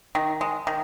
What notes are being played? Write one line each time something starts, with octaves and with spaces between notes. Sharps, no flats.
D#3
G#3
D#3